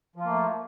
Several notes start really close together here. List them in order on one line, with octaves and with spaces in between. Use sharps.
F3 F4 A#3 A3